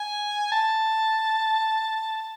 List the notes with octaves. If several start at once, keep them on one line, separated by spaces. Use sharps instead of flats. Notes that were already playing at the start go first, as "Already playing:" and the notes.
Already playing: G#5
A5